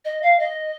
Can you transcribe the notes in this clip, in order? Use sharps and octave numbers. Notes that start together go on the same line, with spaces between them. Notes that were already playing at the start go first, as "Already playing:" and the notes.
D#5
F5
D#5